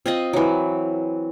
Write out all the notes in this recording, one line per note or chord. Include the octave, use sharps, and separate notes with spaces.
C4 F4 D#5
E3 F#3